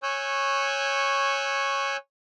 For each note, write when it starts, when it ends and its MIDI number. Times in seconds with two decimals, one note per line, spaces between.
0.03 1.97 73
0.03 1.97 80
0.03 1.97 85
0.03 1.97 88
0.03 1.97 90
0.03 1.97 91